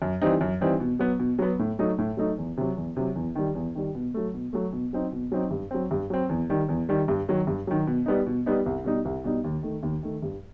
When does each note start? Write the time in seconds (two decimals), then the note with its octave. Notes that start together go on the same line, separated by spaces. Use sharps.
0.02 F#2
0.22 E3 G3 C4 D#4
0.41 F#2
0.61 E3 G3 C4 D#4
0.80 B2
0.99 F#3 B3
1.20 B2
1.39 F#3 B3
1.59 A2
1.79 F#3 A3 D#4
1.98 A2
2.17 F#3 A3 D#4
2.38 E2
2.57 C3 F#3
2.77 E2
2.97 C3 F#3
3.15 E2
3.35 D#3 G3
3.55 E2
3.75 D#3 G3
3.95 B2
4.14 F#3 A3
4.34 B2
4.53 F#3 A3
4.73 B2
4.93 F#3 C4 D#4
5.12 B2
5.32 F#3 C4 D#4
5.51 G2
5.71 F#3 C4
5.91 G2
6.10 F#3 C4
6.29 E2
6.50 D#3 G3
6.69 E2
6.89 D#3 G3
7.08 G2
7.28 D#3 F#3
7.47 G2
7.67 D#3 F#3
7.87 B2
8.06 G3 B3 D#4
8.27 B2
8.46 G3 B3 D#4
8.66 C2
8.84 B2 G3 D#4
9.05 C2
9.24 B2 G3 D#4
9.44 D#2
9.63 D#3 A3
9.83 D#2
10.03 D#3 A3
10.22 G2